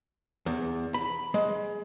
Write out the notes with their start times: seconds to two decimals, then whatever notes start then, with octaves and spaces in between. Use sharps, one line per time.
0.46 E2
0.94 B5
1.34 G#3